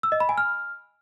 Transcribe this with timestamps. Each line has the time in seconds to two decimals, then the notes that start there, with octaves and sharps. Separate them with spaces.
0.03 E6
0.12 D#5
0.20 B5
0.29 G#5
0.38 F6